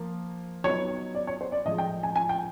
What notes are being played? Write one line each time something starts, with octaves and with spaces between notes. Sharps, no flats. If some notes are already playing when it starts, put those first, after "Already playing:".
Already playing: F3 A#3
F#3 B3 D#4 C#5
D5
C#5
C5
D5
A2 F3 G#3 D#5
G5
G#5
G#5
G5